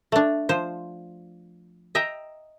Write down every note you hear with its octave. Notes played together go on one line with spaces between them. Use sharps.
A3 D4
F3 C5
D#5 E5 G5 A#5